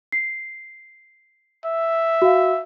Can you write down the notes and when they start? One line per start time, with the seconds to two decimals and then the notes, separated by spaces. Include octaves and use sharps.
0.12 C7
1.65 E5
2.22 F#4 F5